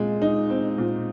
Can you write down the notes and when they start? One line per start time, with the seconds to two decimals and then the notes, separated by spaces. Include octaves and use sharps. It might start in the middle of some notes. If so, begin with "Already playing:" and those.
Already playing: A#2 G#3 C4
0.22 D#4
0.50 C4
0.78 A#2